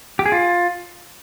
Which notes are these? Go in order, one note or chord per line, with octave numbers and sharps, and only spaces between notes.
G4
G#4
F4